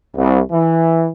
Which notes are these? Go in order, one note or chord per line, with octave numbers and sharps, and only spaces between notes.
C2
E3